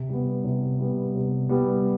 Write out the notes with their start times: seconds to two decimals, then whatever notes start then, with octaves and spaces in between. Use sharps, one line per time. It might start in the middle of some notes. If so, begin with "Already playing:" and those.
Already playing: C3
0.09 G3 B3
0.44 C3
0.79 G3 B3
1.15 C3
1.49 G3 B3